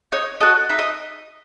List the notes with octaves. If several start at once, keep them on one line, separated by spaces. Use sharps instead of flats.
D#4 C#5
F#4 A4 D#5
D#4 E5
D#5